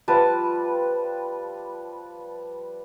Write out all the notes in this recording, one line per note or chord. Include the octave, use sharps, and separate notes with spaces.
F3 G3 B4 A5